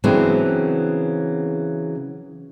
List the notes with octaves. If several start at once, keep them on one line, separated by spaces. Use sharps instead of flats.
C#3 E3 F#3 B3 C4 D4